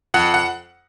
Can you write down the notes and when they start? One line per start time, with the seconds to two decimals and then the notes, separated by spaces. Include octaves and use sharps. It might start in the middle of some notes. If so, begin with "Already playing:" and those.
0.14 F2 F#5
0.34 F#5